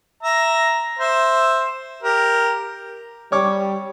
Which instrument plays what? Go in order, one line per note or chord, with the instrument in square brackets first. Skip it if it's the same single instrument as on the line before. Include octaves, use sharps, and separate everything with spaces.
[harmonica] E5 A#5
C5 E5
G4 A#4
[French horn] G3 [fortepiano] C#5 C#6 D6